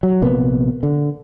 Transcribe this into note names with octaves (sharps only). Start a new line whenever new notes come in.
F#3
A#1 C3 A#3 B3
D3